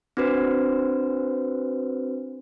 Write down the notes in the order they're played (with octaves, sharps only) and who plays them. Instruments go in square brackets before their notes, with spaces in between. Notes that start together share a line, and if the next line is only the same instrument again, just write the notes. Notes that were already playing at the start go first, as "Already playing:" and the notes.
[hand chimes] C4 D4 F#4 B4 C5